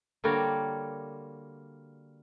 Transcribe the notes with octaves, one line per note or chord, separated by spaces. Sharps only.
D3 G3 A#3 F#4 C#5 D5